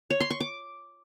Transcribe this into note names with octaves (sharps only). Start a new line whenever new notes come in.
C#5
C6
C#6
D6